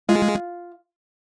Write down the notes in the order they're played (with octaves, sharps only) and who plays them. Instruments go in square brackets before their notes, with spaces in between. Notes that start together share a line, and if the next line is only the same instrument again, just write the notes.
[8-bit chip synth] G#3 [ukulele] F4 F5